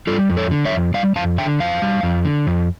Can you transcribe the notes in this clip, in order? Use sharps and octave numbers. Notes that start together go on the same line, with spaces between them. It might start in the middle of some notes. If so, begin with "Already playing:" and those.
G3 F4 A4
F2
A4 C#5
D3
C#5 E5
F2
G3 D5 F5
F2 F5 A5
D3 E5 G5
F2 F5 A5
G3
F2
D3
F2